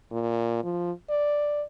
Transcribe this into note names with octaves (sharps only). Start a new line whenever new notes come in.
A#2
F3
D5